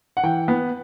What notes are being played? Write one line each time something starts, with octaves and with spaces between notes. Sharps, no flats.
F#5
E3 G5
B3